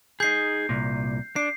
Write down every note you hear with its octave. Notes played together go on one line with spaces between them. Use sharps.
D#4 G#4 G6 C7
C2 A#2
D4 C7